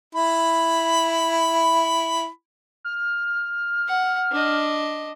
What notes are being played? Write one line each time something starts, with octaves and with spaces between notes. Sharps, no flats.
E4 B5
F6
F#5
D4 D#5